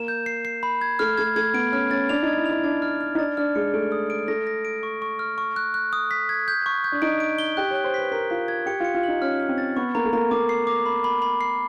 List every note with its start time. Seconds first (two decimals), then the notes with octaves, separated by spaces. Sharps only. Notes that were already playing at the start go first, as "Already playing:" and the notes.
Already playing: A#3 E7
0.08 G6
0.26 C7
0.45 C7
0.63 B5
0.81 G#6
0.99 A3 F6
1.17 A3 G#6
1.36 A3 G#6
1.54 B3 D7
1.72 C#4 F6
1.91 C#4 A6
2.09 D4 F7
2.23 D#4 G#6
2.37 E4
2.46 F7
2.51 E4
2.64 D4 G#6
2.82 F6
3.01 F6
3.15 D#4
3.18 D4 A6
3.37 D4 F6
3.55 G#3 C#7
3.74 A3 D7
3.92 D#6
4.10 D7
4.28 A3 A#6
4.47 A#6
4.65 D7
4.83 C#6
5.02 C#6
5.19 F6
5.38 C#6
5.56 F#6
5.74 F#6
5.93 D#6
6.11 B6
6.29 G#6
6.48 G6
6.66 C#6
6.84 G6
6.92 D4
7.02 D#4 D7
7.20 D7
7.39 G7
7.57 G4 F#6
7.71 C#5 F#6
7.84 C5
7.94 B4 B6
8.12 A#4 B6
8.30 F4 B6
8.48 G#6
8.66 G4 C#7
8.80 F4 C#7
8.95 F4
9.03 D#4 F#7
9.22 C#4 F6
9.40 F6
9.49 C4
9.58 A6
9.77 B3 C#6
9.95 A#3 A#5
10.05 A3
10.13 A#3 A#5
10.31 A#3 D6
10.49 C7
10.67 D6
10.86 B5
11.04 B5
11.22 B5
11.41 C7